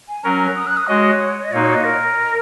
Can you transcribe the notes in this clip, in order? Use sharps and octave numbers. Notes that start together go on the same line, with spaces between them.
G#5
F#3 C#4 A#4 A#5
D#6
F#6
D#6
G#3 F#4 C#5 D#5
D#5
A#2 A#3 D#4 F#4 C#5
C#5
D#5
A#4